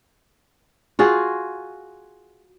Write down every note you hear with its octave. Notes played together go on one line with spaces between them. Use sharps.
F4 F#4 G#4